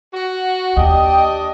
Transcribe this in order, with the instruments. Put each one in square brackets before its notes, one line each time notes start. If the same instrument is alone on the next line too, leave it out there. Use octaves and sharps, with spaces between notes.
[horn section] F#4
[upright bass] D#2 [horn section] D4 G4 D#5 [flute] G5